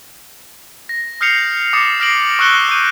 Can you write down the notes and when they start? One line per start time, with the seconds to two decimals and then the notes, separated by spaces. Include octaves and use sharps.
0.89 A#6
1.21 D#6 F6 G6 C7 C#7 F7
1.73 D6 D#6 F6 A6 C#7 E7
2.00 F6 A#6 C7 D7 F#7
2.39 C#6 E6 F#6 C#7 G7
2.69 C#6 D6 G6 D#7